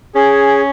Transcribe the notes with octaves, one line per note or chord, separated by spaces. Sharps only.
C#4 G#4